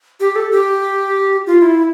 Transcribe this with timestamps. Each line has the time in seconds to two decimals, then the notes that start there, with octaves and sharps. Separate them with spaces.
0.20 G4
0.36 A4
0.52 G4
1.47 F4
1.62 E4
1.78 E4